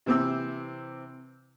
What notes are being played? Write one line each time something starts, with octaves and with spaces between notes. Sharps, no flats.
C3 E3 C4 D6 E6